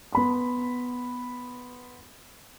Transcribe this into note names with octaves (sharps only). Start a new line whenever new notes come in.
B3 B5 C6